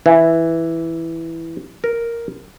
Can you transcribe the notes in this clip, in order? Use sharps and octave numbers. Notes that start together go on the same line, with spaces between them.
E3
A#4